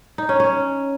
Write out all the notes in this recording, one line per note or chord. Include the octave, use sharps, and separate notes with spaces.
D#4
C#4
C#4